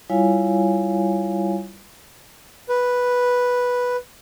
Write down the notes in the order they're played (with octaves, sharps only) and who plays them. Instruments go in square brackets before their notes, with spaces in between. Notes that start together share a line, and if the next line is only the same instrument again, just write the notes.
[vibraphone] G3 E4 F4 C#5 F5 G#5
[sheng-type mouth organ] B4